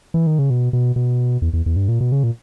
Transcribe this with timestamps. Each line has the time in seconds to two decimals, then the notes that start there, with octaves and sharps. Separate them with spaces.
0.14 E3
0.27 D#3
0.39 C#3
0.50 B2
0.73 B2
0.96 B2
1.42 E2
1.53 E2
1.66 E2
1.76 G2
1.88 A#2
2.01 B2
2.12 C#3
2.23 A#2